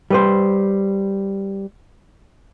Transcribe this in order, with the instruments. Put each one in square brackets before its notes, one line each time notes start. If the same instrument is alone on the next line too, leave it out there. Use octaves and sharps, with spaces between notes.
[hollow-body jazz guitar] G3 B4 C5